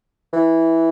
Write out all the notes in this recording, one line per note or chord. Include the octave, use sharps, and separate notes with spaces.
E3